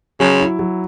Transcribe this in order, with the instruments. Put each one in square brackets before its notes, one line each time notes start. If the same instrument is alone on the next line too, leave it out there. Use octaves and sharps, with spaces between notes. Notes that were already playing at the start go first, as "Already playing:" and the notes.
[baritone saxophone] C#3 [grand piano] F#3
[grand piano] E4
F#3